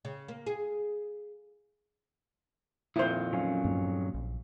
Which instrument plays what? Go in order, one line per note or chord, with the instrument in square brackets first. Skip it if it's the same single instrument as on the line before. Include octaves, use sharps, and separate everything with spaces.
[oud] C#3
A#3
G#4
[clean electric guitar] F2 A#2 D#3 [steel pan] E4 C5
[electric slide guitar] F#3 C#4 F5
[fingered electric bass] G2 A#3
A#1